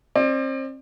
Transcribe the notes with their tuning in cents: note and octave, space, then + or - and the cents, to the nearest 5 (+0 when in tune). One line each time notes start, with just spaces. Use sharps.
C4 +35 D5 +35